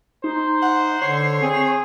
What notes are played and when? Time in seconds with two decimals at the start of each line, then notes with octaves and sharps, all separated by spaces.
0.24 D#4 C5
0.62 F#5
1.02 D3 C#5 C7
1.42 C4 G#4